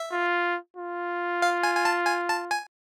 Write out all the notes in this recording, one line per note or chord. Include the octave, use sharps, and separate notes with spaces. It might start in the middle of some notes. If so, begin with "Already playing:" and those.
Already playing: E5
F4
F4
F5
G#5
G#5
A5
G#5
A5
G#5